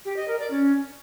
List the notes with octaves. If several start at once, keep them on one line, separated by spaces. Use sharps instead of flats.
G4
D#5
A#4
D5
C#4